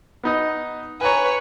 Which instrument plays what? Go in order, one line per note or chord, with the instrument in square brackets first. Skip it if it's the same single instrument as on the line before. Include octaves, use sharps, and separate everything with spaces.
[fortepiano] B3 D#4 D#5
[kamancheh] B4 C#5 [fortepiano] G#5 A#5